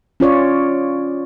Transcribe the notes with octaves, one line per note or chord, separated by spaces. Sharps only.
C#4 F4 C#5 D5